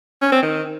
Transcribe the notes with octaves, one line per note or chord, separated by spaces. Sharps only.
C#4
C4
D#3